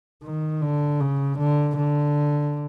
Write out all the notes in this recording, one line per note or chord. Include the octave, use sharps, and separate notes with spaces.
D#3
D3
C#3
D3
D3